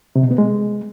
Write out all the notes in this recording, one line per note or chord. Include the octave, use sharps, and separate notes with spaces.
C3
B2
B3
G#3